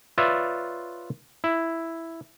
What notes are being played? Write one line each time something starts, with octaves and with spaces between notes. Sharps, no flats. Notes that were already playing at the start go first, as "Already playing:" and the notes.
F4 B4 C#5 D5 E5
E4